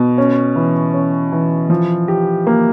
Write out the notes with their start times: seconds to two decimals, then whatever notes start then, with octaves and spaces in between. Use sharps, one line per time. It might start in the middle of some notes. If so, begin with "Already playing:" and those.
Already playing: B2
0.18 C#4
0.56 E3
0.94 C#4
1.32 E3
1.70 F3
2.08 G4
2.47 A#3